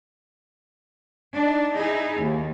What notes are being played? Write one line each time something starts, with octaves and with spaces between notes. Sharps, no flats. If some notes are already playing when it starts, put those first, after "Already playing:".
D4 D#4
D#4 E4 G#4
D#2